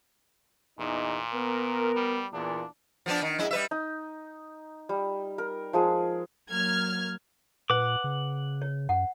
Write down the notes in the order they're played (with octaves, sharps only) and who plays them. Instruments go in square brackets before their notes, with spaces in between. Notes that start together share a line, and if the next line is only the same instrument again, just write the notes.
[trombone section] E2 D#4 [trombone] A#2
[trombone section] B3 A#4
[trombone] G3
[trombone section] E2 A#2 [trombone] D4
[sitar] F3 B3 D4
D#3
F#2 G#3 E4
G3 B4 E5
[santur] D#4
G3
A#4
F3 G#3 G#4
[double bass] F#3 A#3 [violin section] F6 G#6
[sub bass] A#2 [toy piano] B4 [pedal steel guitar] F#5 D6
[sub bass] C#3
[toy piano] C#5
[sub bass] F#2 [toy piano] F#5